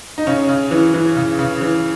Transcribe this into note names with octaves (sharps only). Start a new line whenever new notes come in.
D#4
C#3 C#4
C#3
E3
E3
C#3
C#3
E3